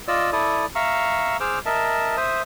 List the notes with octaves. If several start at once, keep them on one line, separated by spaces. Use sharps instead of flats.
F4 D5 D#5 E6
E4 A4 D5 D#6
E5 F5 A#5 C#6 E6
G#4 C5 D6 E6 F6
A#4 D#5 E5 A5
C5 E5 D#6